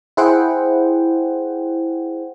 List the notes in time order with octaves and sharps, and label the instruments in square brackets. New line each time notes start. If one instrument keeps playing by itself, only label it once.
[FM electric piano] E4 G#4 C5 F#5 G5